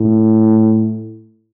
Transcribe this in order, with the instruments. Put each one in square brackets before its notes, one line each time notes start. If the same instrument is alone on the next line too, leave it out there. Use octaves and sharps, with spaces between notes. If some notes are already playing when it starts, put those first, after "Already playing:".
Already playing: [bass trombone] A2